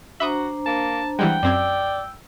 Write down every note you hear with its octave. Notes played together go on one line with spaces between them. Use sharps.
D4 F#4 C5 E5 A#5 B5 D#6
A#3 A5
E3 G3 G#3 F#5 G5
F#2 C4 D5 E6 G#6